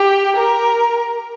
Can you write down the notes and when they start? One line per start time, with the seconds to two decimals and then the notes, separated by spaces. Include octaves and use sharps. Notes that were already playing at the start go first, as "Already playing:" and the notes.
Already playing: G4
0.36 A#4